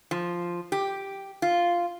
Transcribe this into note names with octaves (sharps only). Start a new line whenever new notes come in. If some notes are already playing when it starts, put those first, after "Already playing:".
F3
G4
F4